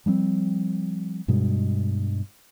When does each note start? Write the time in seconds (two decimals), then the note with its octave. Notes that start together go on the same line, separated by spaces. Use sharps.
0.06 F3 G3 B3 C4
1.28 G2 B2 G3 G#3